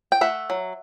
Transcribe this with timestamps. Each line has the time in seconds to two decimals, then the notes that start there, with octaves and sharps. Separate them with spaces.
0.12 G5
0.21 A3 E5 F#5
0.50 F#3